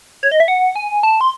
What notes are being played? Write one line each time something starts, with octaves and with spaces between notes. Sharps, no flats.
C#5
D#5
E5
F#5
G#5
A5
C6